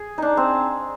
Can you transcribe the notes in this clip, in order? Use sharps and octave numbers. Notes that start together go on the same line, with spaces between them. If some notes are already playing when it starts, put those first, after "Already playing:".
Already playing: G#4
D4 D#4
C4